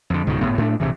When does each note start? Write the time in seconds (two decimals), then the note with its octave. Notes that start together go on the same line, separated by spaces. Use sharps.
0.10 F2 D3
0.27 C#2 G#2 B2 D#3
0.41 G1 A2 B3
0.58 A2 A3 A#3 D4
0.80 A#1 G2 C3 E3